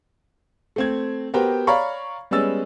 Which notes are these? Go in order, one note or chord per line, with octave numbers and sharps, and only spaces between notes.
A3 C4 G#6
B3 F#4 G4 A#4 C5 G5
C#5 D5 F5 A#5 B5 C#6
G3 G#3 B3 C#4 E6 A6